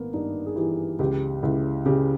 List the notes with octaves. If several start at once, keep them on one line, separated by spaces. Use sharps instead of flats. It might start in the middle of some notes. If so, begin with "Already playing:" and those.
Already playing: G#1 A#3 B3
G2 D#4
G#4
E3 G4
C#2 G4
C#2 E4
C#3 G4